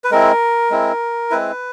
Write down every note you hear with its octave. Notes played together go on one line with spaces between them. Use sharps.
B4
G#3 C4 E4 A#4
G#3 C4 E4
G#3 C4 E4 B4